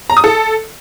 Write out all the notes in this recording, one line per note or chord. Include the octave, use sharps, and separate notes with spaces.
A#5
D#6
A4